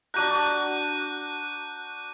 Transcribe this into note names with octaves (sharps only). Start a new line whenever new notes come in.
D4 F#4 A#5 F#6 G6 D#7